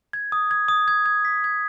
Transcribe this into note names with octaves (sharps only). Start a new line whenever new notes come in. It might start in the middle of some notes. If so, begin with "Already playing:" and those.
G#6
D#6
G#6
D#6
G#6
G#6
B6
G#6